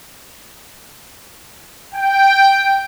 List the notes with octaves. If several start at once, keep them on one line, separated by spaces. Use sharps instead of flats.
G5